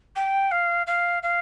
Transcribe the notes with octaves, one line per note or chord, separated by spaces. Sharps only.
G5
F5
F5
F5